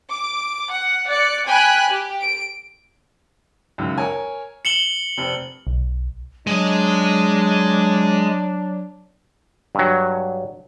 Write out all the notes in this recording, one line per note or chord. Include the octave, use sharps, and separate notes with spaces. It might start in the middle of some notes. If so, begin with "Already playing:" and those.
D6
F#5
D5 F#6 C#7
G5 G#5 B5 F#6
G4
D7
C#2 F#2 D#3
A#4 C#5 G#5
C#7 E7 F#7 G7
F1 C4
B1
F#3 G#3 D4 D#5
G2 F#3